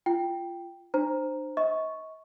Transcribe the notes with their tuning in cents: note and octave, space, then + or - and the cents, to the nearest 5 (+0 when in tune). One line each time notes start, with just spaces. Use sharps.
F4 -20 G5 +0
D4 +45 C5 +0 A#5 +0
D#5 +40 C#6 +0